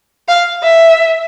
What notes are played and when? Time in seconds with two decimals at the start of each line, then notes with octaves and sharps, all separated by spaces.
0.28 F5
0.63 E5